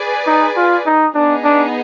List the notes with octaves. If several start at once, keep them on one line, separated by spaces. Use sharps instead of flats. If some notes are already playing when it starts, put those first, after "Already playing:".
Already playing: G#4 B4 D5 G#5
D#4
F4
D#4
B3 D4 D#4 G#4
D4